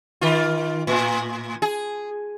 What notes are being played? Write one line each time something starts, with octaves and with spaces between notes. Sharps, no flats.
D#3 F4
A2
G#4